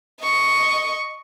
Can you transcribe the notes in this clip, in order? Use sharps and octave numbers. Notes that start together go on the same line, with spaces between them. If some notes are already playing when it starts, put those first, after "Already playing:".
D#5 C#6